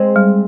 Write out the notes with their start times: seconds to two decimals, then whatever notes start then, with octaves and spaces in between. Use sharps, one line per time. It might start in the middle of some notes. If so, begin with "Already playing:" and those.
Already playing: G#3 C4
0.16 G3